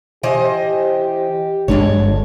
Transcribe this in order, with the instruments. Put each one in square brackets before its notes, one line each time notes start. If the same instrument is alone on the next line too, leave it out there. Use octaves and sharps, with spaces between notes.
[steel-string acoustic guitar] E3 C5 D#5 [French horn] G4
[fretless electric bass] G1 G#3 D4 [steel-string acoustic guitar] F2 A#2 C#5